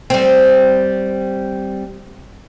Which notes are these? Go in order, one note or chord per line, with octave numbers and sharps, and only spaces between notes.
G3 C4